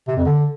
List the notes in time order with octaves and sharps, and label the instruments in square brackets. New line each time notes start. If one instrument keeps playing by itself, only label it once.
[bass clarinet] C3
F2
D3